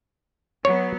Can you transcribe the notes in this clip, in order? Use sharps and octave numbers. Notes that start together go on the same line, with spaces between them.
F#3 B3 C#5